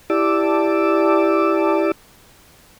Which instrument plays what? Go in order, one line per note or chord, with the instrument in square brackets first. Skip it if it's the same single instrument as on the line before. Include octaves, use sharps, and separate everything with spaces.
[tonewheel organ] E4 G4 D5 A5 D6 E6